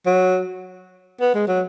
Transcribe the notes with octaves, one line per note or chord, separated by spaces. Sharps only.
F#3
B3
G#3
F#3